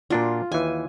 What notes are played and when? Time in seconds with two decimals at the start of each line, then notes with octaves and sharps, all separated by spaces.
0.10 A#2 D4 F4 F#4
0.52 D#2 E3 G#5